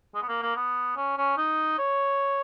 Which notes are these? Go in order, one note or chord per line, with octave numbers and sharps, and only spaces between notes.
G#3
B3
A#3
A#3
B3
C#4
C#4
D#4
C#5